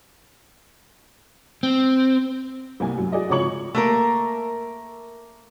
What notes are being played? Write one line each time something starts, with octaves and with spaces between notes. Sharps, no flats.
C4
C2 G3 A#3 G#5
F#2
F#4 G#4 D5 D#5
G#1 C#3 F3 C#5 C#6 F#7
A3 A#3 A#4